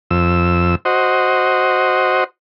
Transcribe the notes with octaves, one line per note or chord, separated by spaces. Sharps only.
F2 E6
F#4 C5 D#5